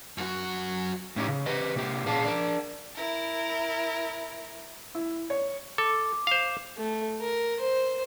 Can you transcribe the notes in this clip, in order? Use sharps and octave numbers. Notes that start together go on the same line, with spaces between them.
F#2 F#4
A2 C#4 D#4 G4
C#3
G4 B4 D#5
C3 A#3 G4
A#2 C#4 G#4 F5 A5
D4 A#4
E4 A#4
E4
C#5
A4 D6
C5 F5
A3
A#4
C5